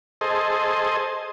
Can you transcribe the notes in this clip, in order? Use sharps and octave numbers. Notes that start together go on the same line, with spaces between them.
G#4 A4 C5 D#5